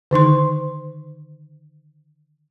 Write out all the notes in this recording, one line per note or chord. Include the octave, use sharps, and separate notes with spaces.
D3 D#3 D#4 C6